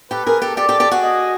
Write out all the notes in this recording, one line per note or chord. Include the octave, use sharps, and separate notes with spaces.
G4 A4 B4
G#4 A#4
G4 A4
G4 A4 D5
G4 A4
G4 A4
F#4 G#4
D#5